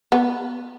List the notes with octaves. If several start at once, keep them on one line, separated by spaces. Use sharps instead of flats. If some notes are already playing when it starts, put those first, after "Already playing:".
B3